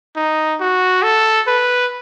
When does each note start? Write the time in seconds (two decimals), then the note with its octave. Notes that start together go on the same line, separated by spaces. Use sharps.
0.16 D#4
0.60 F#4
1.03 A4
1.47 B4